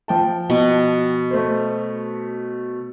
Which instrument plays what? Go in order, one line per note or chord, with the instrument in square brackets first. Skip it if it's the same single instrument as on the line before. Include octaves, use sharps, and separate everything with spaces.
[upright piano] F3 G5 A5
[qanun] B2
[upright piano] A3 C5